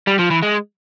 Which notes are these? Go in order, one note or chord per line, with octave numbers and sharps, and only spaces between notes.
G3
F3
E3
G#3